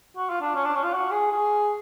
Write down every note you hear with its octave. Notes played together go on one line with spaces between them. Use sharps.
F#4
F4
D4
C#4
D4
C#4
F4
F#4
G#4
G#4